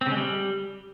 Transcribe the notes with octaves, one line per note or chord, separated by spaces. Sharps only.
C4
C#3
G#3
G3